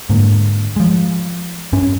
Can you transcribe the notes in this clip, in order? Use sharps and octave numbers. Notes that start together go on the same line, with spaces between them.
G#2 D3 A#3
F3 G#3
G2 C#4